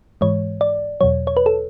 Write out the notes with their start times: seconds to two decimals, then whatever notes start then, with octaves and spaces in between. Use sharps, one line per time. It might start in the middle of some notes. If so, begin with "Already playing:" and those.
0.21 G#2 E3 G#3 C#5
0.61 D5
1.01 E2 B2 F#3 C#5
1.27 C#5
1.37 B4
1.46 A4